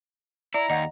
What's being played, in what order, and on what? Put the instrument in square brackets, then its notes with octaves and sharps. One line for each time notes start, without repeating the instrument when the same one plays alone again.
[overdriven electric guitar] E4 [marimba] D5 [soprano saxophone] A#5
[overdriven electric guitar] D#2 [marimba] D#5 F#5